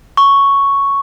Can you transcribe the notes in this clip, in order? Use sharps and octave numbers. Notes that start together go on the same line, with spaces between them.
C#6